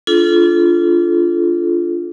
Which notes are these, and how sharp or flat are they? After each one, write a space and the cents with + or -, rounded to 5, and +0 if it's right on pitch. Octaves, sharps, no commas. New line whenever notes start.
D4 -15 F4 -15 A4 -30